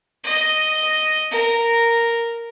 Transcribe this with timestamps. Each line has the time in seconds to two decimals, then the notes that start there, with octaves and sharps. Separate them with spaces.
0.24 D#5
1.31 A#4